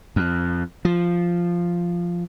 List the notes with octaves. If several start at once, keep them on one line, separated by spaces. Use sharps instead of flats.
F2
F3